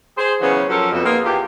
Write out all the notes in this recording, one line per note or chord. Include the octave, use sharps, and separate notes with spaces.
G#4 C5
C#3 E3 F#3 B3 C#4
F3 F#3 C#4 A4 A#4
F2 B2
A#3 B3 D#4 F4 G#4
E2 F4 G4